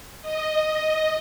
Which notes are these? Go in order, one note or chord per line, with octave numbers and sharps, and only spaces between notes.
D#5